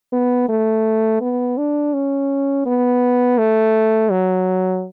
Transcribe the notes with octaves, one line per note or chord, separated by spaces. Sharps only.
B3
A3
B3
D4
C#4
B3
A3
F#3